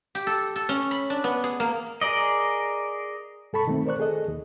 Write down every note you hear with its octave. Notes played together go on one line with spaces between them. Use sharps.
G4
A4
A4
C#4
B5
D4
B3
G#4
A#3
G#4 A#4 D5 D#5
G2 A4 A5 B5 C#6
D#3 A3 C4
A#4 C5 D5 C#6 F#6
G#4 A4 D#5
D#2